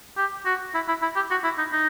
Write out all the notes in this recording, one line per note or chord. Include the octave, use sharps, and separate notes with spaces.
G4
F#4
E4
E4
E4
G4
F#4
E4
D#4
D#4